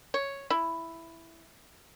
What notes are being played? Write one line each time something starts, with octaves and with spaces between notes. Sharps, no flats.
C#5
E4